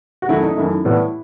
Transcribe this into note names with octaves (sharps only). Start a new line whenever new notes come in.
F#4
F#2 D#3 A3 E4
D#4
F#2 D#3 A3 E4
A2 G3 B3